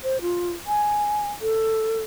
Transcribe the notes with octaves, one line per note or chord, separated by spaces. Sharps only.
C5
F4
G#5
A4